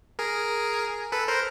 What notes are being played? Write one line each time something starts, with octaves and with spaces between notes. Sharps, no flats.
G#4 A#4
A4 B4
A#4 C5